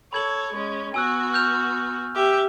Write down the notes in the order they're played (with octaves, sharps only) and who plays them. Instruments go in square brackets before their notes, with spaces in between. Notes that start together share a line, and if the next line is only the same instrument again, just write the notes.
[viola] A4 C#5 [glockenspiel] B5 G#6 F#7
[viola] G#3 C#4
[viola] B3 F#4 [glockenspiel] G#5 E6 F#6
[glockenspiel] F6 G6 F7
[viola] G4 E5